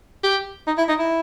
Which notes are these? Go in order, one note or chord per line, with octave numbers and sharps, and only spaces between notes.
G4
D#4
E4
D#4
E4